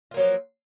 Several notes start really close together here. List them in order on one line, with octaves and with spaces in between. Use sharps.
F4 A#3 F#3 F3